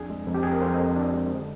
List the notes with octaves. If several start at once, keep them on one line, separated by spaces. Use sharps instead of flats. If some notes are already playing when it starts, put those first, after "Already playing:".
Already playing: F2 D4 G#4
G#3
F2
G4
F2 G#4
A#4
F2 C5
D#5
F2
D4
G#3
D3